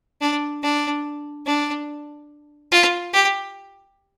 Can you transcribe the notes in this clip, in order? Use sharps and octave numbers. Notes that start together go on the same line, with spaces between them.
D4
D4
D4
F4
G4